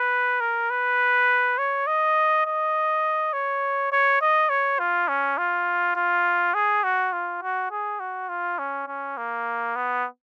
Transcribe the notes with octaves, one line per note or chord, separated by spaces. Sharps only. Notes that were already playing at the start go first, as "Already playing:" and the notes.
Already playing: B4
A#4
B4
C#5
D#5
D#5
C#5
C#5
D#5
C#5
F4
C#4
F4
F4
G#4
F#4
F4
F#4
G#4
F#4
F4
C#4
C#4
A#3
B3